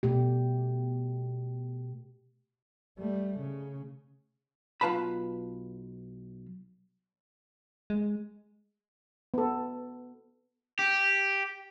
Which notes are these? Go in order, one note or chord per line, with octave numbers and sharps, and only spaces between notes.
B2 A3 G4
G3 A3
C#3
B1 E3 F4 B4 A5 B5
G#3
B3 A4
G4